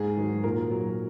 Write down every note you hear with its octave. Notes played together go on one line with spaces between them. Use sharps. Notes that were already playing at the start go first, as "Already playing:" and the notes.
Already playing: G#2 G#4
D#3 F#3
A#2 A#4
F#3